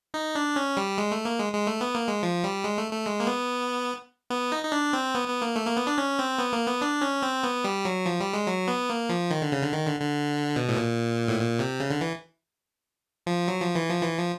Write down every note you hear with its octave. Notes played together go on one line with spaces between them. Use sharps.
D#4
D4
C#4
G3
G#3
A3
A#3
G#3
G#3
A3
B3
A#3
G#3
F3
G3
G#3
A3
A3
G#3
A#3
B3
B3
D#4
D#4
D4
C4
B3
B3
A#3
A3
A#3
B3
D4
C#4
C4
B3
A#3
B3
D4
C#4
C4
B3
G3
F#3
F3
G3
G#3
F#3
B3
A#3
F3
D#3
D3
C#3
D3
D#3
D3
D3
B2
A2
A#2
A2
A#2
C3
C#3
D3
E3
F3
F#3
F3
E3
F3
E3
F3